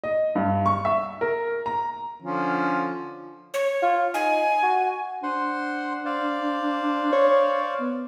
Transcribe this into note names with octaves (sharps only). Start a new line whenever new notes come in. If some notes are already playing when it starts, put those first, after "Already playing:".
D#5
G2
C#6
E5
A#4
A#5
D3 F3 C#4
C#5
F4
D#4 G#5
F#4
D4 C5 F#5 C6
C5 D5 F5
C#5
B3